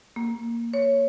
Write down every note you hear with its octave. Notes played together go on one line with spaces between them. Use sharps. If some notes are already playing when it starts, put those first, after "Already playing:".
A#3
C#5